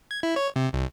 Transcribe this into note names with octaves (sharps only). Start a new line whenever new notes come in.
G#6
E4
C#5
C3
C2